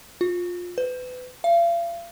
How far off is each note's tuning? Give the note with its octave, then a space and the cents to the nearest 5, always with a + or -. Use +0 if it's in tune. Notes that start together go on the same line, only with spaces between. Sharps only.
F4 +20
B4 +30
F5 -40